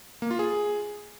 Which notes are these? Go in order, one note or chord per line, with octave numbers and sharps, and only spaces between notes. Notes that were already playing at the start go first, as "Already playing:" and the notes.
A#3
F4
G#4